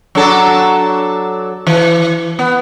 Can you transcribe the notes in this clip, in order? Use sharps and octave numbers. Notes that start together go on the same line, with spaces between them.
F#3 D4 A4
E3
B3